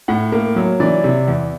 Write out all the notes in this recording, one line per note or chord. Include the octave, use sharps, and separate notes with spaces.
A2 F#5
A#3
F#3
E3 D5
C3
E2